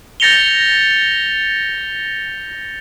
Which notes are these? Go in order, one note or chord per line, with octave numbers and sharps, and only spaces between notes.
G6 A6 A#6 C#7 F7 G7